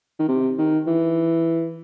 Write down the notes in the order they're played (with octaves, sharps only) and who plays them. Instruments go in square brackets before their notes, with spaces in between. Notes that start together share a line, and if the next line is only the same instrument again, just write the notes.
[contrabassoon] D#3
C3
D#3
E3